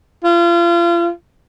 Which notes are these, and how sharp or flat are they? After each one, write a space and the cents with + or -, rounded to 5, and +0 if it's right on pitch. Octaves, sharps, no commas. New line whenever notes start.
F4 -35